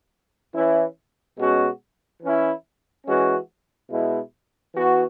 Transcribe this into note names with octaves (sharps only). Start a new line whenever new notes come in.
E3 C#4 E4
B2 G#3 C#4 F#4
E3 C#4 E4
E3 G#3 C#4 F#4
B2 G#3 E4
E3 B3 F#4